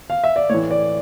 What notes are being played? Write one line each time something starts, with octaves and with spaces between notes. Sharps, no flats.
F5
E5
D5
A2 E3 C#5
D5